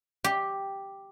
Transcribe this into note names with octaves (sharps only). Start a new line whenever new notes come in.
G4